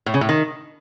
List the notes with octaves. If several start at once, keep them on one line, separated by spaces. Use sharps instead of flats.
A2
C#3
A2
D#3